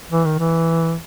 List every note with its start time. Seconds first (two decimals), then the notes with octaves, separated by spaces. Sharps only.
0.11 E3
0.25 D#3
0.39 E3